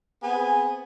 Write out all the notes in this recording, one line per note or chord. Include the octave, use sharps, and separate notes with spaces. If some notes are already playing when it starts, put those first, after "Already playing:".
B3 C4 G#4 G#5